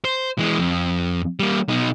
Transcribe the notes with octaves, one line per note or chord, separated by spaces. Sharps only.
C5
E3 G#3
F2
G3 A#3
B2 D#4